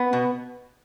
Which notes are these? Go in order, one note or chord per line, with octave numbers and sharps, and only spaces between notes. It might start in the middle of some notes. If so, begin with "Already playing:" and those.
Already playing: B3
B2